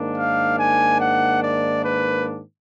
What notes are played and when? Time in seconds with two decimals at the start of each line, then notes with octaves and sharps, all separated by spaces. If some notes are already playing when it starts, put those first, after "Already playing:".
Already playing: G#2 D#3 A#3 D4
0.17 F5
0.58 G#5
1.00 F#5
1.42 D5
1.83 B4